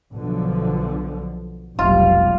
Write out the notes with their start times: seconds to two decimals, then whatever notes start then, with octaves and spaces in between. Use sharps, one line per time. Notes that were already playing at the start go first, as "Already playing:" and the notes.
0.13 B1 D3 F3
1.79 F1 B1 G3 F4